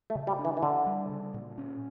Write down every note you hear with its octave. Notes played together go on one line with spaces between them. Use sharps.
A3
C#3
G3
D4
E3
E3
D3 D4
G3
C#3
A#2
C#4